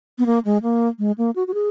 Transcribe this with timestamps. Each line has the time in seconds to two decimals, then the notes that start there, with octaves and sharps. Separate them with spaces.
0.18 B3
0.26 A#3
0.45 G#3
0.63 A#3
0.99 G#3
1.18 A#3
1.36 F#4
1.47 F#4
1.54 G#4